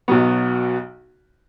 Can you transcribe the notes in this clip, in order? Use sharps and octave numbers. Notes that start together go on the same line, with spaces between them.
B1 B2 F#3 B3